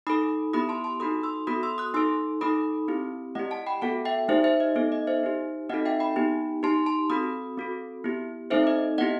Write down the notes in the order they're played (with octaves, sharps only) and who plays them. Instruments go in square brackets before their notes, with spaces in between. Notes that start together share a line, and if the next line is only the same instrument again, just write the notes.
[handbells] D#4 A4 B5 D#6
B3 E4 G4 B5 D#6
A5 C6
A5 C6
D#4 F#4 A4 B5 D#6
C6 E6
B3 F#4 A4 B5 D#6
C6 E6
D#6 F#6
D#4 A4 C6 E6
D#4 A4 B5 D#6
C4 E4 G4
A3 E4 G4 D#5 F#5
F#5 A5
G5 B5
B3 F#4 A4 F#5 A5
E5 G5
A3 D#4 G4 C5 E5
C5 E5
D#5
B3 D#4 A4
D#5
C5 E5
D#4 G4
C4 D#4 F#4 A4 D#5 F#5
E5 G5
G5 B5
B3 D#4 G4
D#4 G4 A5 C6
A5 C6
C4 F#4 A4 B5 D#6
C4 F#4 A4
B3 E4 G4
A3 C4 D#4 A4 C5 E5
D#5
B3 E4 G4 D#5 F#5